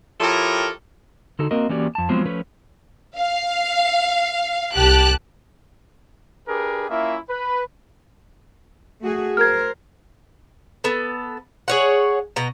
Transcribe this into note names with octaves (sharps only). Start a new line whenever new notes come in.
F3 E4 G4 A4 A#4 C#5
D3 D#4 F#4 A4
A#3 C4 F#4 A#4 D#5
E3 A#3 C#4 F#4 G4 D5
F2 A5
F3 F#3 G#3 B3 C4
F3 A3 C#4 B4 C#5
F5
C2 G4 A5 F#6
D4 G4 G#4 A#4 B4
A#3 C#4 E4 F4 E5
B4
A3 F#4 G#4
A#4 C5 F6 G#6
B3 A4
G#4 C#5 F#5
B2 A#5